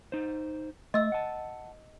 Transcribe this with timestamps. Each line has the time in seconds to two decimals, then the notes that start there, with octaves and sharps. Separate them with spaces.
0.12 D#4 C5
0.94 A3 D#5 E6
1.12 F#5 A5